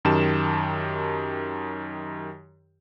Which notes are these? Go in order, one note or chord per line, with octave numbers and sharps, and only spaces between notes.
F#2 D#3 G4 A5 E7